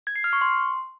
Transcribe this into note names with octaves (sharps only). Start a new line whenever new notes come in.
G#6
C7
F6
C#6
C6